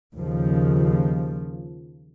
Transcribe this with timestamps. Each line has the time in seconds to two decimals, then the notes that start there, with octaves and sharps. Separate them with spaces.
0.14 D#2 C#3 F3